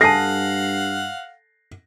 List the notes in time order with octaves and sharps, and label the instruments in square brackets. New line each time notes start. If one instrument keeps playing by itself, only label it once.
[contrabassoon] G2 [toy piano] A4 G#5 A5 [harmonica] F5 F#5 [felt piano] A#6 C7